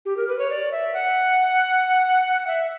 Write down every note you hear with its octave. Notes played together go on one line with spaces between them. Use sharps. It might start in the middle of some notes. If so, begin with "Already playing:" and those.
G4
A#4
B4
C#5
D5
E5
F#5
F#5
E5